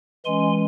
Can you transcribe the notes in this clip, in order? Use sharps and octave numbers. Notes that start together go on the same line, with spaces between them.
E3 G#3 C#4 G#5 C6